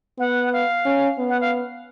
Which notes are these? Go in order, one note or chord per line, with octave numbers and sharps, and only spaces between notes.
B3 F#5
F5
C#4
B3
F#5
F5